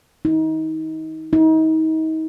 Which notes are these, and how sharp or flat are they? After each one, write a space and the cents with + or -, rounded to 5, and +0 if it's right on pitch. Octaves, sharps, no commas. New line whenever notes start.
D#4 +30
D#4 +35